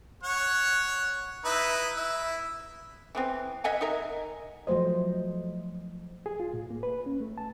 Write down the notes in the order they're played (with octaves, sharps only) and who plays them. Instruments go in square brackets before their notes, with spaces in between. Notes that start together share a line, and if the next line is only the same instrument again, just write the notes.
[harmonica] C#5 F#5
D#4 E4 B4
E4
[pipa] E3 B3 C4
D#5 E5 F#5 G#5
D#4 A#4 E5
[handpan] F3 F#3 A3 C5 D#5
[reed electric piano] G#4
F4
A2
A#3
B4
C#4
A3
A5